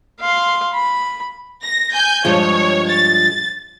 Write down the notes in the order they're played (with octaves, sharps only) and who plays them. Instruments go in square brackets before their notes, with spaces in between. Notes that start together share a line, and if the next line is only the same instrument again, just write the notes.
[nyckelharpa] F5 C6
B5
[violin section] A#6
G#5 G6
[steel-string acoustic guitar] G2 F3 G#3 [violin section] C#5
[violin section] A6